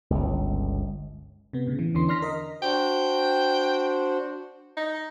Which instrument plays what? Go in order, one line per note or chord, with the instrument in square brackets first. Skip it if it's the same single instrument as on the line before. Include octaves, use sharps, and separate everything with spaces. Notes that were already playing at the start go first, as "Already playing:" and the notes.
[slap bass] G1 C#2
[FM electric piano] C3 B3
A2 C#3
E3
E2 D3 E3 C#4 C6
D4 C6 F6 A#6 B6
A#4 D#5
[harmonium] D4 F#4 C5 [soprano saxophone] G5
[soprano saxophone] D#4